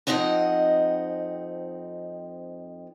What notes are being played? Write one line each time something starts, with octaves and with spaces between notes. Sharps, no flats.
F2 C#3 C4 D#4 D#5 F#5